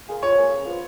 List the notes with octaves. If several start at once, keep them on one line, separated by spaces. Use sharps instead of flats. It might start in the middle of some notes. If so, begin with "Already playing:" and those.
A#3 F4 G#4
F3 C#5
A#3 F4 G#4
C#3
F3 B3 F4